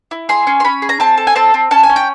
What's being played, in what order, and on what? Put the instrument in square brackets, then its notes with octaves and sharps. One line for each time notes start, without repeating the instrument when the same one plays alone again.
[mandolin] E4
G#4 C6
C#4
C6
C#4 B5
G#4
A#5
C4 A5
A4
G#5
C4 A5
C4
C#4 A5
G#5
C#4
G5